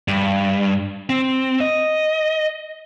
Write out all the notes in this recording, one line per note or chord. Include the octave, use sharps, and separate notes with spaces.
G2
C4
D#5